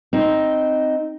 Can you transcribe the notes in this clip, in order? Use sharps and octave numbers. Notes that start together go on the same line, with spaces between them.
C4 D#4